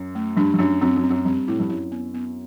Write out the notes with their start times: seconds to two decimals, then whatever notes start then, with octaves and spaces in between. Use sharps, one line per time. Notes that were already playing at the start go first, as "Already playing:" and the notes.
Already playing: F#2
0.15 A3
0.37 G2 D4
0.54 G2
0.59 F#2 D4
0.81 F#2 C4
0.96 F#2
1.04 C4
1.11 F#2
1.25 G2 C4
1.48 A2 E4
1.60 G2
1.69 F#2 E4
1.92 B3
2.14 B3